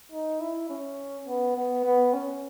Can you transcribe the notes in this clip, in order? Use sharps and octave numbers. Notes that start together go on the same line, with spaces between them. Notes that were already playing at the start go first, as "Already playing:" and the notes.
D#4
E4
C#4
B3
B3
B3
C#4